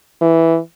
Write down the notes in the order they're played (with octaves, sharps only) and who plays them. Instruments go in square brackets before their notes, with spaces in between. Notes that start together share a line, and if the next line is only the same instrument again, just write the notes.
[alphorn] E3